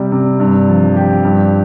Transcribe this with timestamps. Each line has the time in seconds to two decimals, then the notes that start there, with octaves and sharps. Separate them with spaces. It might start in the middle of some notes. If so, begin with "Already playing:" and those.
Already playing: C3 G3 G4
0.12 C3
0.40 G2
0.68 F3
0.96 G4
1.25 G2